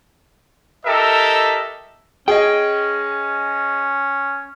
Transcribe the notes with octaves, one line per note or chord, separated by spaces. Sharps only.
E4 G4 A4 A#4 D#5 E5
C#4 G#4 D#5 G5